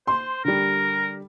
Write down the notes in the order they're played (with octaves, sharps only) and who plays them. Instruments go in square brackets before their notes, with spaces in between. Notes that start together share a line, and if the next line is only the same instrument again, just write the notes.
[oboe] C5 [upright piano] C6
[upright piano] D3 G3 [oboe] A#4